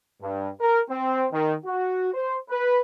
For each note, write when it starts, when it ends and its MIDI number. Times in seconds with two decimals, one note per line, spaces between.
0.21 0.49 43
0.60 0.80 70
0.90 1.26 60
1.32 1.54 51
1.65 2.09 66
2.14 2.36 72
2.50 2.80 71